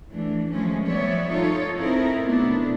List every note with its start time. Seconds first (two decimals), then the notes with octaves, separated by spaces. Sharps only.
0.10 E3 A3 D4
0.51 D#3 F3 F#3 G#3 A3 C#4
0.86 F3 G3 B3 C#5 D5 E5
1.31 D#4 F4 A4 C#5
1.78 C4 D#4 E4 A4 A#4
2.24 B2 A3 B3 D4 E4